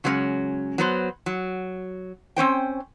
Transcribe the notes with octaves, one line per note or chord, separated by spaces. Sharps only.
C#3 F#3 G#3 C4 C#4
F#3 B3 C5
F#3
C4 C#4 C5 G5